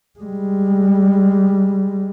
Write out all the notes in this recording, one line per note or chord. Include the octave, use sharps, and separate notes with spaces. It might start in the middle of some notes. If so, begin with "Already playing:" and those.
G3 G#3